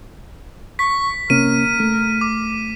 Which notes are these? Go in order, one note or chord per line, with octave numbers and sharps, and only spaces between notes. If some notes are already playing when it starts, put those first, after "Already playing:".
C#6 B6
C3 A#3 C#4 A#4 D#7
A3
D6